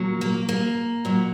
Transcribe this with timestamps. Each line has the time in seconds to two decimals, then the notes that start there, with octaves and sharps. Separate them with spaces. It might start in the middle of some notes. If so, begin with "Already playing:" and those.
Already playing: A#2 F#3
0.21 A#3
0.49 A#3
1.05 A#2 F#3